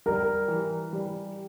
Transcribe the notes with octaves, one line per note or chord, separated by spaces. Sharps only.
G3 A#4
E3
G3